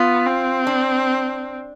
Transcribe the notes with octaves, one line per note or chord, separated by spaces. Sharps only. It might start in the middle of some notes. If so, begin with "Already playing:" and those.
Already playing: B3 F4
C4
D4